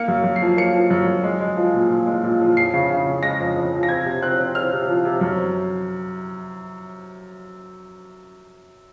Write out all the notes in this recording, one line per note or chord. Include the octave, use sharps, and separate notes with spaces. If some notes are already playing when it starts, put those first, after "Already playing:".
Already playing: A#3 C#7
F#2
F#2
C7
F3
A#3 C#7
F3
F#2
F#2
G#3
G#3
F3
A#2
A#2
G#3
A#2
F3
F2 C7
C#3
C#3
C#3
G#3 A#6
F2
F2
F3
A#6
C4 G#6
C3
C4 F#6
C4
C4 F6
C3
F3
C3
F#2